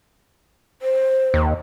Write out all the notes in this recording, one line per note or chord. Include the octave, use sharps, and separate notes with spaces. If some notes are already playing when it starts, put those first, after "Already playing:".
C5
D#2